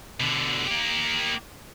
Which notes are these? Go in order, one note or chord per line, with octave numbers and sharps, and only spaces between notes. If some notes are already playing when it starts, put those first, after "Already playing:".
B2 D3
A#3 G4